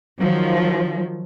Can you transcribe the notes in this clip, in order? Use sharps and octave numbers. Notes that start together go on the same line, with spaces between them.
D#3 F3 F#3